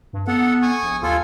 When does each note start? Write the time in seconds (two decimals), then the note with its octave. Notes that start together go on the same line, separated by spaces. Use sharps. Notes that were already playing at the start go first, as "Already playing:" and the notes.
0.13 G2
0.28 B3 A4 F#5
0.62 G#5 C#6 D#6
0.83 A#1
1.03 D#2 F4 A4 G#5